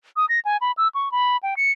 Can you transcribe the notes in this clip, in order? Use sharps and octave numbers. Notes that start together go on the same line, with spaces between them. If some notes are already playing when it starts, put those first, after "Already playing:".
D#6
A#6
G#5
B5
E6
C#6
B5
G5
C#7